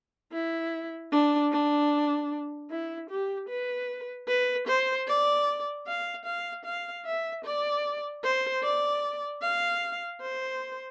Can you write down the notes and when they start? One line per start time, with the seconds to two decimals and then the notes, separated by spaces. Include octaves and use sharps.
0.32 E4
1.12 D4
1.52 D4
2.70 E4
3.10 G4
3.49 B4
4.28 B4
4.67 C5
5.08 D5
5.87 F5
6.25 F5
6.65 F5
7.05 E5
7.45 D5
8.23 C5
8.63 D5
9.42 F5
10.21 C5